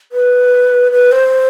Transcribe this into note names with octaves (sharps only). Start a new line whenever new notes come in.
B4
B4
C5